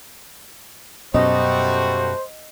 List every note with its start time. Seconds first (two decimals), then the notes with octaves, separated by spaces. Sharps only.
1.14 F#2 B2 G3 A3 C#4 F#4 C5 D#5